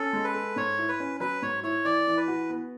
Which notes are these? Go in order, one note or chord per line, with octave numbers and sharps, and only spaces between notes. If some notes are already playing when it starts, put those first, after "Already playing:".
Already playing: C#4 A4
G#3
B4
A4
G#2 C#5
E4
B4
C#4
F#3 B4
G#2 C#5
E4 C#5
E3 D5
E3
B4
F#4
B3